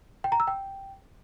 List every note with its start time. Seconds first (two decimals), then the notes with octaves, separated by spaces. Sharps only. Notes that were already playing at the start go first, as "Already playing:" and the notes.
0.24 G5
0.32 A#5
0.40 E6
0.47 G5